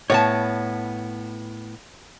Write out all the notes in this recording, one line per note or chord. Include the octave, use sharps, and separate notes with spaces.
A2 B3 C#5 A5